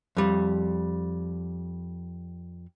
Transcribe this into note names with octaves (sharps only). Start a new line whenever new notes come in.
F2 G3